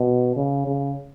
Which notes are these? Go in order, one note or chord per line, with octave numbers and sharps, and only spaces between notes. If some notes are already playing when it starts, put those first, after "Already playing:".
Already playing: B2
C#3
C#3